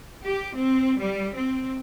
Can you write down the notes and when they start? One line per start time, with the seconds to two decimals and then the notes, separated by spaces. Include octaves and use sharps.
0.24 G4
0.56 C4
0.98 G3
1.35 C4